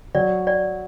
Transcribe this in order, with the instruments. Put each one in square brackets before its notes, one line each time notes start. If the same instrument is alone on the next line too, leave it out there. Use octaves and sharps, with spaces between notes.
[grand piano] F#3 F#4 [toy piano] D5
[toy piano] D5